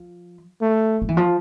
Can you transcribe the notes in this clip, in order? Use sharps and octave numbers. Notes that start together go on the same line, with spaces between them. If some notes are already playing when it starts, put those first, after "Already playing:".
Already playing: F3
A3
F3
E3
F3